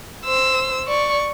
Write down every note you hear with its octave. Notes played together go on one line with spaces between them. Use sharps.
C5 E6
D5 C#6